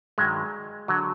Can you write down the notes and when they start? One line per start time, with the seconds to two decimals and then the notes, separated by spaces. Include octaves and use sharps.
0.18 G2 D#3 F#3 G#3
0.88 D3 F#3